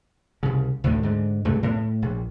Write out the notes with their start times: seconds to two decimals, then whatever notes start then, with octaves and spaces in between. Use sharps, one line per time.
0.43 C2 C#3
0.84 D2 A2 D3 D#3
1.03 G#2 D3
1.45 C#2 G2 C3 A3
1.63 A2
2.02 A#1